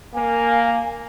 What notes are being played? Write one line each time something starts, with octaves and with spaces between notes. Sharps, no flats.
A#3 G#5